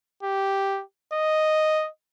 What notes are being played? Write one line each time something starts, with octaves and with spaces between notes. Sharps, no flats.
G4
D#5